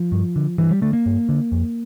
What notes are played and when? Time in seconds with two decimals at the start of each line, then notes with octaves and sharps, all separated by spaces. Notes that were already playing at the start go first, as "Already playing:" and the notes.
Already playing: F3
0.12 G2
0.36 D3
0.58 G2 E3
0.71 G3
0.82 D3 A3
0.93 A#3
1.06 G2
1.29 D3
1.52 F2